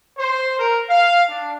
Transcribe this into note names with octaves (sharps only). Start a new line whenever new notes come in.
C5
A#4
F5
D4